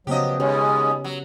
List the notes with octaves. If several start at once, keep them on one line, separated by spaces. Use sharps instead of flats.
C#3 F3 F#3 B3 C#4 G4 D#5
D#2 B2 G#3 C#4 G4 C#5
F#3